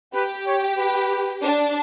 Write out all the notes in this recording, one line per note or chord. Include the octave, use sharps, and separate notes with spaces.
G4 B4
C#5
B4
D4